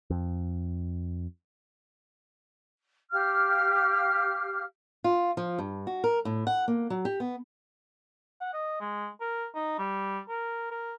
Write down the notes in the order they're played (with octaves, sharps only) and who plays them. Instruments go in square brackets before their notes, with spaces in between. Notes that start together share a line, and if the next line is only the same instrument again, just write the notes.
[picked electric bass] F2
[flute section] G4 F5 F6
[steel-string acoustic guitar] F4
F3
G2
F#4
A#4
A2
F#5
A#3
F#3
G4
B3
[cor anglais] F#5
D#5
G#3
A#4
D#4
G3
A#4
A#4